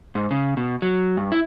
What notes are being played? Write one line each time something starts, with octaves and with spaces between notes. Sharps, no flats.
G#2
C#3
B2
F#3
G2
E4